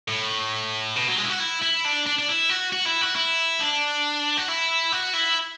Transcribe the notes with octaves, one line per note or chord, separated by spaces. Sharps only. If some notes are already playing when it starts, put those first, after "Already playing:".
A2
B2
F#3
G#3
E4
F#4
E4
E4
D4
D4
D4
E4
F#4
F#4
E4
F#4
E4
D4
F#4
E4
F#4
E4